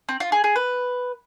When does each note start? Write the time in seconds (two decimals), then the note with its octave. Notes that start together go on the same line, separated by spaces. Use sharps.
0.09 C4
0.20 F4
0.32 G#4
0.44 G#4
0.56 B4